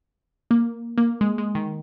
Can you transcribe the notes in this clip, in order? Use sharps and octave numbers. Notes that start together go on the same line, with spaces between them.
A#3
A#3
G#3
G#3
D#3